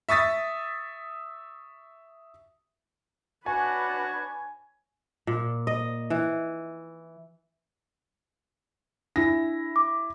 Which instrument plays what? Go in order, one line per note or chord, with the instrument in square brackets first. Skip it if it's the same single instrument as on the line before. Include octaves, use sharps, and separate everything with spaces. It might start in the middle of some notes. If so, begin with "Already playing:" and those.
[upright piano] E5 C#6 D#6 A6 B6
[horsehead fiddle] D4 B4 [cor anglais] F#4 [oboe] C#5 [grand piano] G#5
[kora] A#2
D#5
E3
[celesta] D4 [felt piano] E4 A#6
[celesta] D6